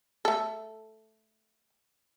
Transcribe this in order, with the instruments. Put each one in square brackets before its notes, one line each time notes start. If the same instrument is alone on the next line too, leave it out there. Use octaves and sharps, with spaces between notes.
[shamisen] A3 A4